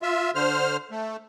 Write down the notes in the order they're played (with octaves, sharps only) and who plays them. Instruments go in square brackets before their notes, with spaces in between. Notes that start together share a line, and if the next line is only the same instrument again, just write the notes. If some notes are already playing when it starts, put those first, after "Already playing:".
[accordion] F4 E5
D3 C5 F6
A3